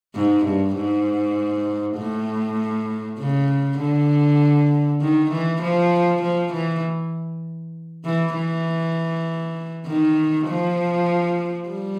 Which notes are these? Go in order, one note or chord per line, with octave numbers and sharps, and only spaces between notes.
G#2
G2
G#2
A2
C#3
D3
D#3
E3
F3
F3
E3
E3
E3
D#3
F3
G3